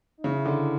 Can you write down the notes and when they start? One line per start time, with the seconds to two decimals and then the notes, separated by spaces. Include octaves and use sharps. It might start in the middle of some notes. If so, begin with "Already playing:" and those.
0.18 D#4
0.24 C#3 E4
0.46 D3